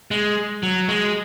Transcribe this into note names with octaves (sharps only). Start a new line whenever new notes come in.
G#3
F#3
G#3